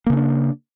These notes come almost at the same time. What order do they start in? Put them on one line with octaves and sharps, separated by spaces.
A#3 C#3 C#4 D4